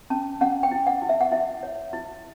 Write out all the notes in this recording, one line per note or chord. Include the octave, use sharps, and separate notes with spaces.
C#4 A5
C#4 F#5
G5
E4
F#5
E4
E5
F#5
E4 E5
C#5
E4